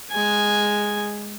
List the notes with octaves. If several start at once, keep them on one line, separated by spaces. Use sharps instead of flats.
G#3 G#5